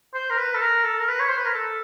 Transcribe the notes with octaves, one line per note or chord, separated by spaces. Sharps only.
C5
A#4
B4
A4
A#4
A4
A#4
B4
C#5
C5
B4
A#4
A4